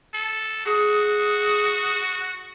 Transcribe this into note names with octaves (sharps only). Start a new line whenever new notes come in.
A4
F#4 G#4